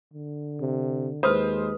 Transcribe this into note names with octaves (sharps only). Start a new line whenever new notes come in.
D3
C3
D#2 G#3 B4 C5 D#6 F6